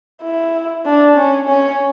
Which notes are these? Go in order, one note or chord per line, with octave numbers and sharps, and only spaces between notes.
E4
D4
C#4
C#4